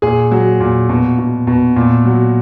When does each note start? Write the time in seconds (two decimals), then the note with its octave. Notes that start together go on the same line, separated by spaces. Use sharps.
0.02 A#2 G#4
0.31 F#3
0.60 A#2
0.89 B2
1.18 B2
1.47 B2
1.76 A#2
2.05 F#3